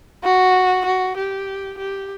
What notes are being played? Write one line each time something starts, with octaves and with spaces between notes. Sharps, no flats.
F#4
F#4
G4
G4